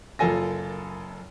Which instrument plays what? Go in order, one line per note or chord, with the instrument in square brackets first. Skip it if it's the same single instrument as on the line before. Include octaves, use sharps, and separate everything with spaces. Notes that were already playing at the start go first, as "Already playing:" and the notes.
[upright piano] F#1 F#2 F4 A4 G#5 A#6